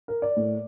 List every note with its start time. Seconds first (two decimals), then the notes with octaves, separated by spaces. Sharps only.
0.08 A#4
0.22 D5
0.37 A2